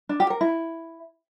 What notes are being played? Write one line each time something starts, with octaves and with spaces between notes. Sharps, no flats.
D4
G4
A#4
E4